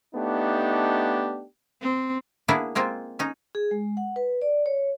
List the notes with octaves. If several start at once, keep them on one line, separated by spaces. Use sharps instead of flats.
A3 B3 D4 D#4 G4
C4
A#3 B3 D4 E4 G#4
G#3 A#3 C4 F4
C#4 D#4
G#4
G#3
F#5
B4
D5
C#5